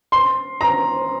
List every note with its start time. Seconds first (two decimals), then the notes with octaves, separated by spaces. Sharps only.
0.12 C6
0.61 A#5